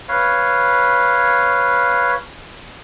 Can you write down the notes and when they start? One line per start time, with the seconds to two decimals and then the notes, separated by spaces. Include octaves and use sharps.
0.09 B4 C#5 F5